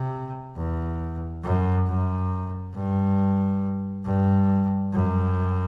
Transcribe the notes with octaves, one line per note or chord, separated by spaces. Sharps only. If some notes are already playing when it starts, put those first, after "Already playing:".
Already playing: C3
E2
F#2
F#2
G2
G2
F#2